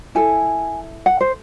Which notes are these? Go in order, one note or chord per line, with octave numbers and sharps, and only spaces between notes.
E4 A4 G#5
F#5
C5